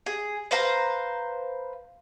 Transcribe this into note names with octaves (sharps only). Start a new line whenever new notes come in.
G#4
B4 C5 F5 A#5